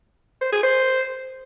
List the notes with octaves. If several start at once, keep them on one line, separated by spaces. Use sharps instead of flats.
C5
G#4
C5